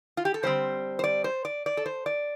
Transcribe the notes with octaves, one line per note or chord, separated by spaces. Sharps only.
F4
G4
A4
D3 G3 C4 C5
C5
D5
C5
D5
D5
A4
C5
D5